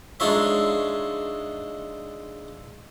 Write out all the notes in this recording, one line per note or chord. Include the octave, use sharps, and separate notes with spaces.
G#3 D4 D#4 F4 C#5 E5